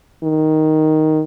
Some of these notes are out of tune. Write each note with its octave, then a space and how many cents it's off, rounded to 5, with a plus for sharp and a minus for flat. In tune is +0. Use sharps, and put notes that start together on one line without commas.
D#3 +5